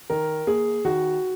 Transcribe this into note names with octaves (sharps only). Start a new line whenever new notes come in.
D#3 A#4
A#3 G#4
D#3 F#4